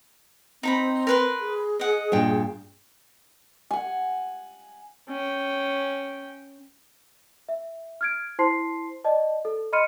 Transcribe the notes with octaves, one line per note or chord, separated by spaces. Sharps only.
C4 D#4 A#5 B5
A#4 B4 C6
G#4
D#5 F#5
G2 A#2 G5
F#5 G#5
C#4 G5
E5
F6 G#6 D7
E4 C5 A5 C6 C7
D5 D#5 A5
A4
D#5 B5 C6 F6 C#7 D#7